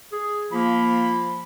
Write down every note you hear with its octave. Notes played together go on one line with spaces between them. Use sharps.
G#4
F3 A#3 B5